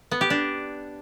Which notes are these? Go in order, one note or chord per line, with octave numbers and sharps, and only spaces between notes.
B3
G4
D4